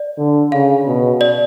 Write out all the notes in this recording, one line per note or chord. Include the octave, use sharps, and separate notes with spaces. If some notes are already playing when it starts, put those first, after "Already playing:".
Already playing: D5
D3
C#3 F5
B2
D5